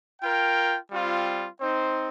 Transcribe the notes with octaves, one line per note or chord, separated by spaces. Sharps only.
F4 A#4 G5
G3 C4 F4
C4 D#4 C5